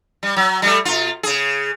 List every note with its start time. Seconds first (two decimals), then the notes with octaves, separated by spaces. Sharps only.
0.23 G3
0.36 F#3
0.62 G3 A3
0.85 B2 F4
1.23 C#3 G#4